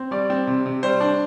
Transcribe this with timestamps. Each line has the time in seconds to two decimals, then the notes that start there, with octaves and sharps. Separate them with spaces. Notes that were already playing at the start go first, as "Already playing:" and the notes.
Already playing: C4
0.11 G3 D5
0.30 C4
0.47 C3
0.66 C3
0.83 G3 C5
1.01 D4